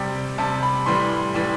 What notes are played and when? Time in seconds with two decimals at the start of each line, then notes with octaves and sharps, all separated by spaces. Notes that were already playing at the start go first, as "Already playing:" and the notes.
Already playing: C3 G3 G5
0.38 C3 G3 A5
0.63 B5
0.86 A2 E3 G3 C6
1.34 A2 E3 G3